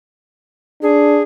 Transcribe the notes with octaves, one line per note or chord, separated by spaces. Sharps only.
D4 G#4